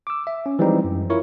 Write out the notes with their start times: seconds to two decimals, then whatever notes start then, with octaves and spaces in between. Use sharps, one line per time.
0.07 D6 E6
0.27 E5
0.46 C#4
0.59 E3 F3 G3 G#3 C4 D#4
0.84 F#2
1.10 E4 F4 A#4 C#5 C#6